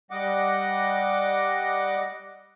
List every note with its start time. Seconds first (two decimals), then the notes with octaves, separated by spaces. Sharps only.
0.11 G3 D#5 F#5 D6